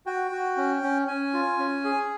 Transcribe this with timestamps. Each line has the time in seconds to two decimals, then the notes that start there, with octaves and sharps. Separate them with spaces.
0.06 F#4 G5
0.32 F#4
0.57 C#4
0.83 C#4
1.08 C#4 G#5
1.34 F4
1.59 C#4
1.84 G#4